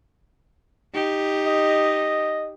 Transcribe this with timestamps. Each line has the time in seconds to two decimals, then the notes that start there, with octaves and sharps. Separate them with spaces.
0.94 D#4 G4
1.47 D#5